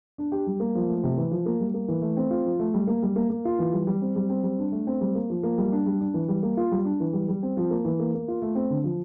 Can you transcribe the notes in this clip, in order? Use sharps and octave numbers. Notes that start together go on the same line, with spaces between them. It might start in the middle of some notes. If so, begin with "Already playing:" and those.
D4
G4
G3
A#3
F3
A3
C3
E3
F3
A#3
G3
A#3
E3
A3
C4
F4
F3
A3
G3
A#3
G3
A#3
A#3
F4
E3
G3
G3
C4
G3
C4
G3
D4
A3
C4
G3
A#3
F3
A#3
G3
D4
G3
D4
E3
G3
A#3
F4
G3
D4
E3
G3
G3
C4
F3
A#3
E3
A#3
A#3
F4
A3
C4
D3
F3